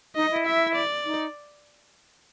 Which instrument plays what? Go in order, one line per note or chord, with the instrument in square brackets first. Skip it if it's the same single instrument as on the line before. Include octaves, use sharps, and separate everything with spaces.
[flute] D#4 [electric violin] D#5
[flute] E4
[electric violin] E5
D5
[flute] D#4